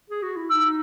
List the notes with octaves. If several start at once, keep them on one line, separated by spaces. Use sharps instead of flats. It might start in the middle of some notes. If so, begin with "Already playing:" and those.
G#4
F#4
E4
D#4 E6